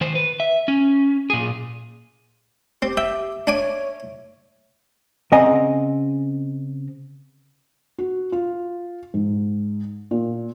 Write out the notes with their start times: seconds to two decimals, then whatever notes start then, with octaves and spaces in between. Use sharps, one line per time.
0.01 D#3 C5
0.15 B4
0.40 E5
0.68 C#4
1.30 A#2 G#4
2.82 C4 G4
2.97 E5 G5
3.47 D4 C#5 G#5 D6
5.32 C#3 C4 D#5 F#5 G#5 A#5
7.98 F#4
8.32 F4
9.14 G#2
10.11 A#2